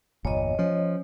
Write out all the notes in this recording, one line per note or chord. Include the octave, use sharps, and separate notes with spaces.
G1 E2 A#2 C#5 D#5
F3 C#4